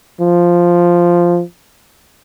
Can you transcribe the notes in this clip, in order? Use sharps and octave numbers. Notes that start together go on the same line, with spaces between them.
F3